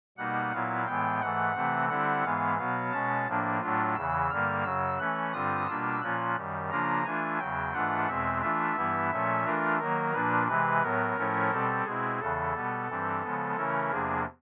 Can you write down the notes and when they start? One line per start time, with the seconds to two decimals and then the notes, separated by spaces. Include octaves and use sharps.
0.18 B2 G3 A#3 D#4 F#5
0.52 A#2 F#3 B3 E4 F5
0.86 A2 E3 G#3 B3 G5
1.21 G#2 E3 A3 F#5
1.55 C3 E3 A3 C4
1.89 D3 G3 C4 E4 F#5
2.24 G#2 E3 G#3 B3 F5
2.58 B2 F#3 B3 F5
2.92 B2 G#3 C#4 A5
3.27 A2 F3 A#3 D4
3.61 A2 F#3 A3 D4 F4
3.96 E2 C#3 E3 E6
4.29 G2 D3 G3 A#3 F6
4.64 F#2 C#3 F#3 E6
4.99 E3 A3 C#4 F#6
5.33 G2 D3 G3 C4 F4 D#6
5.67 B2 G3 A#3 D4 F4 E6
6.01 A#2 F3 A#3 C#4 F4 F#6
6.36 F#2 D#3 G3
6.70 C#3 F3 A#3 D4 F4 A#5
7.05 E3 A3 D4 F4 G#5
7.39 E2 C#3 F#3 G5
7.73 G#2 E3 A3 D4 F4 F#5
8.07 E2 B2 G#3 C4 E5
8.42 E3 A3 D4 F4 E5
8.76 G2 E3 G3 B3 E4
9.10 A#2 F3 A3 C#4
9.44 E3 A3 D4 F4 A#4
9.79 D#3 F#3 A#3 A#4
10.14 A#2 F3 A#3 D4 B4
10.47 C3 E3 G#3 B4
10.82 A2 F#3 B3 A#4
11.17 A2 F3 A3 C#4 E4
11.50 B2 G3 C4 A4
11.85 B2 G#3 C4 E4 G#4
12.20 E2 C#3 E3 A4
12.54 B2 G3 B3
12.88 G2 E3 G3 C4
13.22 C#3 F3 G#3 B3
13.57 C#3 E3 A3 C#4 E4 A#4
13.91 E2 C3 F3 A#3 D4 G#4